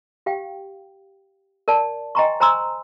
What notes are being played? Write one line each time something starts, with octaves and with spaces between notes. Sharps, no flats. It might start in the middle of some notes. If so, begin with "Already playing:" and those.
G4 F5 G5
A#4 D5 A5
D#5 G5 G#5 A#5 C6 C#6
C5 G#5 A#5 C6 E6